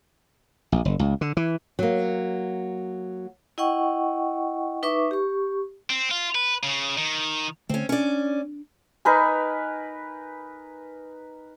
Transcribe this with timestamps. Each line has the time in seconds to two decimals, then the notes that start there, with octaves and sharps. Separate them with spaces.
0.72 A#1
0.85 F#1
0.99 C#2
1.21 D3
1.37 E3
1.79 F#3 A#3
3.58 E4 D#5 F#5 G5 C#6
4.83 D#4 B4 E5 C#6 D6
5.11 G4 C#6
5.90 C4
6.11 F4
6.35 B4
6.63 C#3
6.98 D#3
7.69 D3 A3 C4 C#4
7.89 C#4 D4 D5
9.05 D#4 A#4 B4 G#5